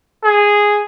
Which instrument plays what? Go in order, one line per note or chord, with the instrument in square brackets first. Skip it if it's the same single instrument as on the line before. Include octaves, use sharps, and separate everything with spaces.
[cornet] G#4